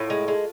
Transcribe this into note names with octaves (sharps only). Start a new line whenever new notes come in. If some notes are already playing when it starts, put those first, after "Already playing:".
Already playing: A2 F4
G#3
G#3